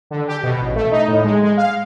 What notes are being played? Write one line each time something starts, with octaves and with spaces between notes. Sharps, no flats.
D3
G4
B2
A1
A3
D#4
A2
G#3
G#3
F5